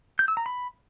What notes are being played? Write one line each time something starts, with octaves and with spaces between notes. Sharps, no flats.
G6
E6
A#5
B5